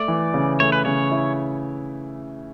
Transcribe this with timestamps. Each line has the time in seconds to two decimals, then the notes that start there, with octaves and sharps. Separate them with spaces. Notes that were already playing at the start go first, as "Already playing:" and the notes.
Already playing: A3 D5
0.08 E3
0.34 C#3
0.60 A3 C#5
0.72 B4
0.85 C#3 C#5
1.11 E4